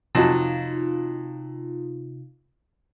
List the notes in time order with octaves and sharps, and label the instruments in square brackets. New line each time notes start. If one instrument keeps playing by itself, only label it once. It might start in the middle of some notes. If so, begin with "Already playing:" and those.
[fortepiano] F2 F#3 [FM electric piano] C3 D#4 F4